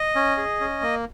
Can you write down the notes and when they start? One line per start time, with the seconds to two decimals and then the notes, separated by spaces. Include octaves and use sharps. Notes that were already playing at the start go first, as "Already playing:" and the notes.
Already playing: D#5
0.16 C#4
0.37 G#4
0.60 C#4
0.82 A#3